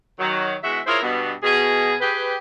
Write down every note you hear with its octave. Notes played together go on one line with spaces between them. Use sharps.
D#3 F#3
E2 G#3 F#4 E5
E4 F4 G#4 A#4 C5 C#5
G2 B2 B3
B2 G#4
G4 G#4 B4